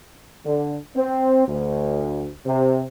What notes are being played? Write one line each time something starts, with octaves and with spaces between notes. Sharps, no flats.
D3
C4
D2
C3